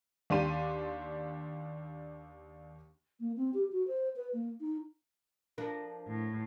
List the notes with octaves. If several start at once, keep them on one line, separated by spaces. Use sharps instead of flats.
D#2 D4 G4 C6 D#7
A#3
C4
G4
F#4
C5
B4
A#3
D#4
F3 D4 A#4
A2